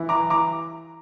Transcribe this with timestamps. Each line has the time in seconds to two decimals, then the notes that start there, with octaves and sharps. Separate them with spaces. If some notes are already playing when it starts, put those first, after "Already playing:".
Already playing: E3
0.09 A#5 D6
0.30 A#5 D6